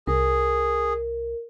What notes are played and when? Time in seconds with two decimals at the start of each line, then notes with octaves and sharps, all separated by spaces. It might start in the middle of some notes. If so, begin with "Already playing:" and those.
0.07 C2 G#4 A#4